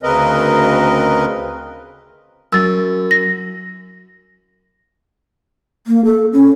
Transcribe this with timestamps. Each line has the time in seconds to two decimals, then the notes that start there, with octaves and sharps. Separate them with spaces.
0.03 D2 C#3 C4 A#4 B4 D#5
2.53 F#2 E6 A6
3.11 A#6
5.87 A#3
6.05 A4
6.33 C#4